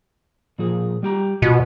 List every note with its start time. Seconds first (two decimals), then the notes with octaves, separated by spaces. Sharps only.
0.59 A#2 F3 G#4
1.03 G3 G4 A#5
1.42 B2 F4 F#4